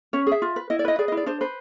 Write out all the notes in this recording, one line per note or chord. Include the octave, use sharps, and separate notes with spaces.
C#4 C#5
G#4 E5
F4
B4
E4 D#5
D5
B4 D#5
G#4 D5
D#5
E4
D5
D4 C5
B4 C5